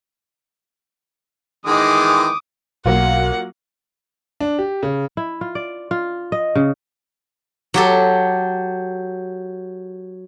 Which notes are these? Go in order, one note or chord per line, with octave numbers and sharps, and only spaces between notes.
D#3 E3 G#3 D6 D#6
B1 F#3 A#3 F4 F#5
D4
G4
C#3
E4
F4
D5
F4
D#5
C#3
F#3 G4 A4